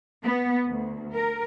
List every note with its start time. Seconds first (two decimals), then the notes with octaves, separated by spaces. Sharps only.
0.23 B3
0.67 D2
1.13 A#4